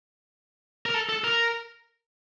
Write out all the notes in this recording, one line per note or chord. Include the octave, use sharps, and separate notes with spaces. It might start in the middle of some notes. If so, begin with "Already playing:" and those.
A#4
A4
A4
A#4